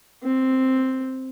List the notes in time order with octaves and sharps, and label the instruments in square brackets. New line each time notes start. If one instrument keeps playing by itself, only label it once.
[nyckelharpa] C4